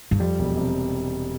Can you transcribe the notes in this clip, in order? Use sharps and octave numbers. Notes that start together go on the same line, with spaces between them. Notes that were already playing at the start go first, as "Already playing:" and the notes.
G2
F2 G3
E1
C3